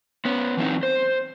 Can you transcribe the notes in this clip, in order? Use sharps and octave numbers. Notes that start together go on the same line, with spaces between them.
B3 C#4
E3 F#3 C4 D#4
C5